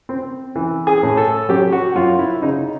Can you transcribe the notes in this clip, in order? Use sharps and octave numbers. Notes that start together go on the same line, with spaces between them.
C4
E3
G#4
A2
A4
F#3 G4
F#4
F#2 F4
E4
C#3 D#4